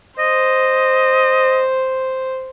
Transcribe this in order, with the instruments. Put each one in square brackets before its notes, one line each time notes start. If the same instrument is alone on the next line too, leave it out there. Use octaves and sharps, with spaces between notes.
[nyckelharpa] C5 [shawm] D#5